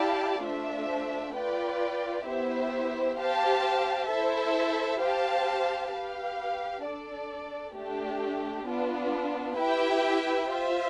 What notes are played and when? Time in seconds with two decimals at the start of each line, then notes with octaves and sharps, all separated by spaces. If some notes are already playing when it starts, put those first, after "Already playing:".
Already playing: E4 G4 D5 F5 A5
0.43 A3 D4 F4 C5 E5
1.35 F4 B4 D5 G5
2.26 B3 E4 G4 C5 E5
3.17 G4 C5 F5 A5
4.09 E4 A4 C5 E5
5.01 G4 C5 F5 A5
5.92 G4 B4 F5
6.84 D4 A4 D5
7.75 A3 D4 G4
8.67 B3 D4 F4
9.58 E4 G4 B4 E5 G5
10.50 F4 C5 E5